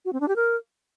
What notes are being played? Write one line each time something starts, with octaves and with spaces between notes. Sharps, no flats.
F#4
C4
D4
G4
A#4